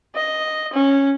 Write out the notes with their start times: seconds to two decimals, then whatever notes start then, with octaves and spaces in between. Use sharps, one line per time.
0.15 D#5
0.73 C#4